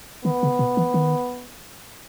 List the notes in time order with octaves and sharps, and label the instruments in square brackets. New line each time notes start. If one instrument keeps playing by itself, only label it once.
[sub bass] D#3 [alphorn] B3
[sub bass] C#3
B2
E3
D#3